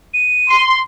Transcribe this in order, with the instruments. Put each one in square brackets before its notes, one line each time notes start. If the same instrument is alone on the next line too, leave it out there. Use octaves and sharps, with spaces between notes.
[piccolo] D#7
[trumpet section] C6